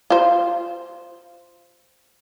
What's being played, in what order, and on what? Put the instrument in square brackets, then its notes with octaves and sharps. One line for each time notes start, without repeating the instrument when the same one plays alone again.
[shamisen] F4 C5